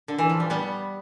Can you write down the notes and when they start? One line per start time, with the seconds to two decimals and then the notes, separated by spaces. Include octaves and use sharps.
0.08 D3
0.18 E3
0.30 F3
0.40 G3
0.50 G3 B3